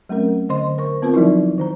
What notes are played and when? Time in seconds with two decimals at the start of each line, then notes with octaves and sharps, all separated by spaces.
0.09 F#3 A3 C4 C#4 A#4
0.49 D3 C5 D#5 C6
0.78 A#4 C5 C#6
1.02 B3 C4 F4 A#4 B4
1.14 F3 F#3 D#4 E4
1.58 D#3 C5 A#5